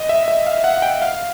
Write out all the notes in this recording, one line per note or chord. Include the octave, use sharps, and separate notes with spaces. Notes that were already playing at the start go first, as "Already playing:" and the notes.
Already playing: D#5
E5
E5
F5
F#5
G5
F5